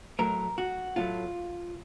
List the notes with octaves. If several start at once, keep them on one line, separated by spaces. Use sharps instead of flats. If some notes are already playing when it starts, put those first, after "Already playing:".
A2 F#3 A3 A#4
F#4
A2 F#3 A3 F4